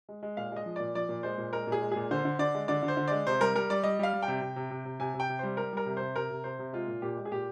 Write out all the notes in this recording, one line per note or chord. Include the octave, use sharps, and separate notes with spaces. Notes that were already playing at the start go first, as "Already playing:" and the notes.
G#3
G#3
A#2 F5
G#3 D#5
F3
A#2 D5
F3 D5
A#2
G#3 C5
A#2
G#3 A#4
A#2
G#4
G#3
A#2 G#4
D3 C5
D3
D3 D5
G#3
D3 D5
D3
C5
D3
G#3 D5
C3 C5
G3 A#4
G3 A#4
G3 D5
G3 D#5
G3 F5
G3
G5
C3
C3
C3
C3
C3
C3 G#5
C3
G5
C3
G3 C5
G3 A#4
G3 A#4
C3
C3 C5
C3 A#4
C3
C3 C5
C3
G#3 F4
A#2
A#2 G4
G#3
G#4
A#2 G4